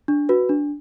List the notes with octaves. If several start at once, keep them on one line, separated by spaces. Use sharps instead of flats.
D4
F#4 B4
D4